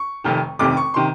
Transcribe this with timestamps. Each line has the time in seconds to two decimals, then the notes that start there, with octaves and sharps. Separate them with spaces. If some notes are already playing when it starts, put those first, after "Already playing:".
Already playing: C#6
0.24 F1 F2 C3 D#3
0.59 F1 F2 C3 D#3 D6
0.77 C#6
0.94 C3 D#3 C6